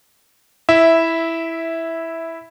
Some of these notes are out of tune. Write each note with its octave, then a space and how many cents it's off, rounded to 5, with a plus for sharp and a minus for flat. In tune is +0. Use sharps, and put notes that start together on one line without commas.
E4 +0 E5 -10